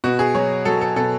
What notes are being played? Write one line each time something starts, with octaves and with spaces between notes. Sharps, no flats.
B2 F#4
G#4
F#3 C#5
F#3 A4
A4
B2 A4